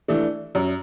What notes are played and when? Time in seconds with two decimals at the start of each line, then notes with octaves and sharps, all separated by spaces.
0.08 E3 A3 D4
0.55 F#2